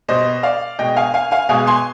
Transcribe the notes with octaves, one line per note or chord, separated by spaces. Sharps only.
B2 G3 C5 D#5
D5 F5
B2 G#3 D#5 G5
F5 G#5
F5 G#5
F5 G#5
B2 G#3 F5 G#5
G#5 C6